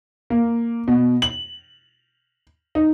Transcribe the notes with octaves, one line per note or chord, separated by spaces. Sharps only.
A#3
B2
F#7
D#4